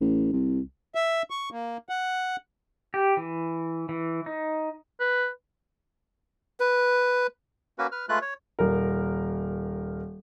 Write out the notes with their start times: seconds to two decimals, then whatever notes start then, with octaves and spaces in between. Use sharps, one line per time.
0.01 A1
0.33 C2
0.95 E5
1.30 C#6
1.52 A#3
1.89 F#5
2.94 G4
3.17 E3
3.89 E3
4.26 D#4
5.00 B4
6.60 B4
7.78 A#3 C#4 F#4 B4
7.92 B4 F6
8.09 G#3 A3 F4 B4 F#6
8.22 C#5
8.59 D#1 A#4